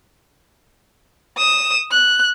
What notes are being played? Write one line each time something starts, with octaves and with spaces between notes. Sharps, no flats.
D#6 E7
F#6